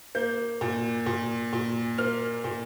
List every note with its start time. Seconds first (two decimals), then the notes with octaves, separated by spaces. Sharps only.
0.15 A#3 G6
0.61 A#2
1.06 A#2
1.53 A#2
1.98 A#3 F6
2.44 A#2